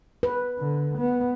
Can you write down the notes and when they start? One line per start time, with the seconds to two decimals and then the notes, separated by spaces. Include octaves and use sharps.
0.23 B4
0.59 D3
0.98 B3